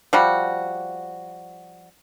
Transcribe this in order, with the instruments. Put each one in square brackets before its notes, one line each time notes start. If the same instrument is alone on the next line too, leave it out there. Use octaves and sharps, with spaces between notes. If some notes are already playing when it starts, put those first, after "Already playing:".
[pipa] F3 G3 F#4